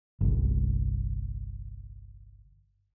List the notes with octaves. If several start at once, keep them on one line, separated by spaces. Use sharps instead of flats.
G1 C2